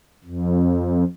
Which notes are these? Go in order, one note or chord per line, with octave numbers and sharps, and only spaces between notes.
F2